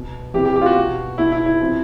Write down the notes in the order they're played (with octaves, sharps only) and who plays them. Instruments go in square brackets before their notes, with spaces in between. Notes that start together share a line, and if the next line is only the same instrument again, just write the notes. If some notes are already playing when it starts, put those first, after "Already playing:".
Already playing: [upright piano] B2
C3 E3 G4
G4
G4
F4
F#4
B2
B2 E4
E4
E4
C3 F3